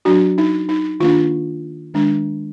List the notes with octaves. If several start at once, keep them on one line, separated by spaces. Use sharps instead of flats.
F#3 D4 F#4
D#4
D#4
D#3 A#3 D4 F4
D#3 G#3 D4